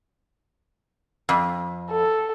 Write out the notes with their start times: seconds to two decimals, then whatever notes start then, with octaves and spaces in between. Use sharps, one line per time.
1.29 F2
1.91 A4